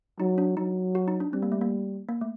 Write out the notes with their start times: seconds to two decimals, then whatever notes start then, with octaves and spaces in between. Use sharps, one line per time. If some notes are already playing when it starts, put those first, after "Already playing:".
0.20 F#3 D#4
0.38 D4
0.57 F#3 D#4
0.95 F#4
1.08 D#4
1.20 D4
1.33 G3 C4
1.43 A#3
1.52 A3
1.61 A#3
2.09 A#3
2.21 A3